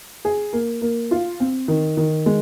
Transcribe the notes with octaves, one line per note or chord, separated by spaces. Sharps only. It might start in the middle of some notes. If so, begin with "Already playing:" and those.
G#4
A#3
A#3
F4
C4
D#3
D#3
G#3